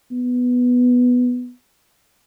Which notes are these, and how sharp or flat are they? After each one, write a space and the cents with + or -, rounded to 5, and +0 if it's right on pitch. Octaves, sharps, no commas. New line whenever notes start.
B3 +0